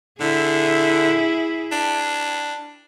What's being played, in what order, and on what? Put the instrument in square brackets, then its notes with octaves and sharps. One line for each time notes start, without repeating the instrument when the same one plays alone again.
[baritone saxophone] D3 [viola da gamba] E4 G#4
[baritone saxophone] D4